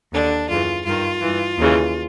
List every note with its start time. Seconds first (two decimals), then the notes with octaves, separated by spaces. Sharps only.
0.12 D#2 D3 D4
0.48 F#2 C#3 E3 F4
0.85 G2 D#3 F4
1.22 G2 E3
1.58 D#2 C#3 E3